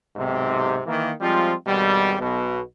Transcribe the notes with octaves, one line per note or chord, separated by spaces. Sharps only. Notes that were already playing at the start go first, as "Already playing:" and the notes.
B1 G#2 C3
D#3 E3 A#3
F3 G3 G#3 C4 F4
G#1 B2 G3
B1 B2